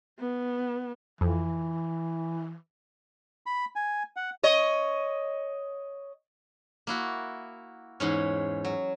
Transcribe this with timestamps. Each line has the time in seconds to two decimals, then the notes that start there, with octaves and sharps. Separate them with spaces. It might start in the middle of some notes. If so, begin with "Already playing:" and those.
0.19 B3
1.21 F2 E3
3.46 B5
3.76 G#5
4.16 F#5
4.43 C#5 D#5
6.87 A#3 E4 F#4
8.00 E2 G#2 C#4
8.65 F#3